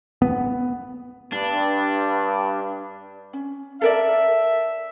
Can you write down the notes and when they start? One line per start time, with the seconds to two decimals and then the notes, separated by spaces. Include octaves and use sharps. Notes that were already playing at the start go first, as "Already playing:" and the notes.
0.22 B3
1.33 G2 D4
3.33 C#4
3.81 A4 A#4 D5 E5